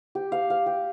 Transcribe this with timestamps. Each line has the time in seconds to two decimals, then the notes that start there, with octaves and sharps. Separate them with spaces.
0.15 G4
0.32 F5
0.50 F5
0.66 G4